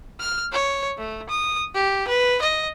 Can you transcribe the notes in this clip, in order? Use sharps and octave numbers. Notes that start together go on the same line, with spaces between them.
F6
C#5
A3
D#6
G4
B4
D#5